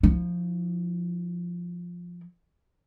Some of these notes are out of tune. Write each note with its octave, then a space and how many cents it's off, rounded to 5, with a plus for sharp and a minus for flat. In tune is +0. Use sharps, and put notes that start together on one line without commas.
F3 +5 E4 -45